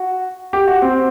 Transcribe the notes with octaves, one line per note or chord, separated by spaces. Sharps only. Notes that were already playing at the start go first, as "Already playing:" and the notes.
Already playing: F#4
G4
F#4
C4